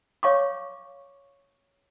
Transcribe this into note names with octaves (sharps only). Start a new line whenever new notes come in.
C#5 F5 C#6 D6